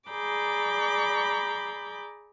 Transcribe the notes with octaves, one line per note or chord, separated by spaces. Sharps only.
G#4 D5 A#5 B5 D6 G6